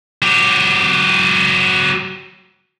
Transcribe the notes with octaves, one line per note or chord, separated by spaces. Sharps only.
F#3 G4